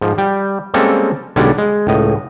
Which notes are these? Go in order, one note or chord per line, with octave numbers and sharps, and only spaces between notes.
G#2 F3
G3 G5
G3 G#3 A#3 C4 C#4 A4
B1 D3 G3 G#3 C#5 D5
G#3
C#2 A2 D#5